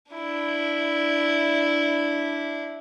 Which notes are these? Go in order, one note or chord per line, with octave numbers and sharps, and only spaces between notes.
D4 E4